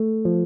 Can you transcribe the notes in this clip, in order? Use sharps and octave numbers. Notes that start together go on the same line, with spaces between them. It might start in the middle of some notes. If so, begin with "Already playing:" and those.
Already playing: A3
F3